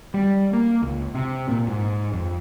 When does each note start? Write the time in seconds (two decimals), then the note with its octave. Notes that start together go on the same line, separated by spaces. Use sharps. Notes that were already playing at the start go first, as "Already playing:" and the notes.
0.14 G3
0.53 A#3
0.83 C#2
1.14 C3
1.49 A#2
1.68 G#2
2.13 F2